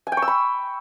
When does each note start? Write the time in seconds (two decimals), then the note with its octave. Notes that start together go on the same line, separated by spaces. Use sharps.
0.07 G#5
0.12 G5
0.17 C#6
0.22 E6
0.28 B5